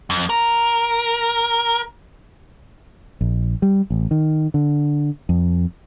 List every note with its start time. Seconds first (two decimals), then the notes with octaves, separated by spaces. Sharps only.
0.10 F2
0.29 A#4
3.21 A#1
3.62 G3
3.90 A1
4.11 D#3
4.54 D3
5.29 F2